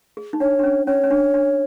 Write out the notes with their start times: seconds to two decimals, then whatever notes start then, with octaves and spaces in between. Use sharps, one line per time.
0.17 G#4
0.33 D#4
0.40 D4 C#5
0.59 D4
0.63 C#4
0.87 C#4 C#5
1.04 C#4
1.10 D4
1.34 D4